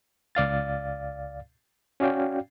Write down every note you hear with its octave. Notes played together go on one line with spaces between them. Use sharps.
C#2 D5 F5 A6
C#4 F#4 D5 F5 G5